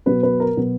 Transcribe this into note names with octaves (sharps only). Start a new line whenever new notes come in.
B2 F#3 B3 B4
B4
A#4
B2 F#3 B3